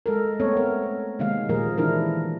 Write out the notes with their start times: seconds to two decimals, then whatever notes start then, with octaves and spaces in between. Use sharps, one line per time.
0.06 G#3 A4 A#4
0.40 A3 B3 C4 A4 C#5
0.57 A#4
1.19 C3 D#3 G#3 A#3 F5
1.49 A#2 F3 A#3 G#4 A#4
1.78 D#3 E3 D4 E4 A#4